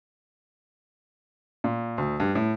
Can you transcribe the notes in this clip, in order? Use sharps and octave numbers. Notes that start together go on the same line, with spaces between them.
A#2
D2
G2
A2